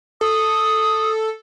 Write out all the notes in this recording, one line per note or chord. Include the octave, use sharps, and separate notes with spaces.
A4 D#6